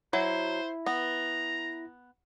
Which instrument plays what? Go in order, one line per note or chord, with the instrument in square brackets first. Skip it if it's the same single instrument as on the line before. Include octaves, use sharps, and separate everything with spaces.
[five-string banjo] F#3 [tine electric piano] E4 [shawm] C5
[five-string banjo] B3 [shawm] A#5